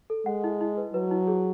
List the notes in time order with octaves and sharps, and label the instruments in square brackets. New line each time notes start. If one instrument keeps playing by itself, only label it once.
[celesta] A4
[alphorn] G#3 [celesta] F#5
[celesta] E4
E4
B4
[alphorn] F#3 [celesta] B4
[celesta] E4
G#4